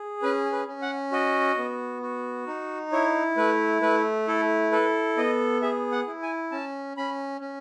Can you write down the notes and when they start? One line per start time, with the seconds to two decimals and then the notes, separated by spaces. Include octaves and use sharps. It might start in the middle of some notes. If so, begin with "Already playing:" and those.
Already playing: G#4
0.22 C#4 B4
0.53 B4
0.68 C#4
0.82 F#5
1.12 F#4 D#5
1.57 B3
2.02 F#4
2.47 D#4
2.92 E4 C#5
3.37 A3 B4
3.82 A3 B4
4.28 E4 A4
4.72 A4 B4
5.17 B3 D#5
5.62 G#4 E5
5.92 F#5
6.07 E4
6.22 G#5
6.51 C#4 A5
6.97 C#4 B5
7.41 C#4